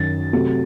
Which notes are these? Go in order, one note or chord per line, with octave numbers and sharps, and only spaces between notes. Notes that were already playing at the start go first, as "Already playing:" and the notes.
Already playing: F#2 D#3 F#3 A6
C3 F#3 A3